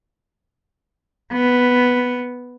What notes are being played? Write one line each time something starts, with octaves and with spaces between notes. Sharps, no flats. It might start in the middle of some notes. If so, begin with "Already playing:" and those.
B3